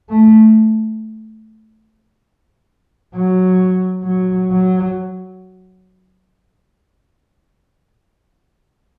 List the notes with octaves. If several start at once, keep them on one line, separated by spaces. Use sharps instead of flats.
A3
F#3
F#3
F#3